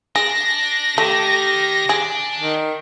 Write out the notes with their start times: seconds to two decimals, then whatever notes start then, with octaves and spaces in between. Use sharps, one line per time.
0.15 D4 G#4 A#6
0.98 D#3 A3 G4
1.89 D4 G#4
2.40 D#3